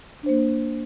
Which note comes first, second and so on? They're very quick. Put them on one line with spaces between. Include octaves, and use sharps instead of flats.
D4 C5 A#3